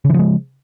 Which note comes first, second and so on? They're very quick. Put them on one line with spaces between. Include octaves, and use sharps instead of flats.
C#3 E3 F3 G#3